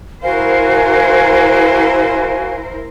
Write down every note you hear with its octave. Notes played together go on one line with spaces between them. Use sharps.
E4 F#4 A#4 C5 F5 G#5